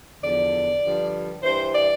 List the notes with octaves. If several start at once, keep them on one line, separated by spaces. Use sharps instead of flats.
E2 D3 F3 D5
G2 D3 F3
G2 E3 C5
D5